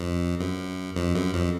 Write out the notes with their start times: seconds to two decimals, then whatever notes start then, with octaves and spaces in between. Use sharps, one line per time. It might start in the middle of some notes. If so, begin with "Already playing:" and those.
Already playing: F2
0.40 F#2
0.96 F2
1.15 F#2
1.33 F2